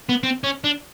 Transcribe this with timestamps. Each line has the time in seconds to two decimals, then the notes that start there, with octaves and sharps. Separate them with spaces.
0.09 B3
0.23 C4
0.44 C#4
0.64 D4